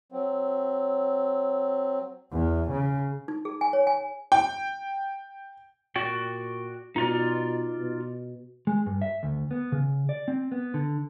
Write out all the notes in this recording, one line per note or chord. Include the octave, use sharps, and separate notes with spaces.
F#3 C4
E2
C#3
D#4
G#4
G#5
C#5
G#5
G5
A#2 F#4 D5 G5
B2 D#4 F4 D5
B2
G#3
G2
E5
D2
B3
C#3
D5
C4
B3
D3